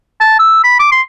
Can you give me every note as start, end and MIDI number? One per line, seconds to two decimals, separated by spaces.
0.20 0.34 81
0.39 0.61 88
0.64 0.75 83
0.79 0.90 86
0.92 1.01 84